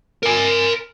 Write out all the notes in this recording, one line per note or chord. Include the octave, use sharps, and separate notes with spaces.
A#4 G#5